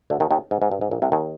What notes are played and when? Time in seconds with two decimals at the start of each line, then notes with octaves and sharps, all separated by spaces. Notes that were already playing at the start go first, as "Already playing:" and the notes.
0.10 D2 D3
0.20 D#2 D#3
0.31 D#2 D#3
0.51 G#2
0.62 G#2
0.71 G2
0.81 G#2
0.91 A#1 A#2
1.02 C2 C3
1.12 D#2 D#3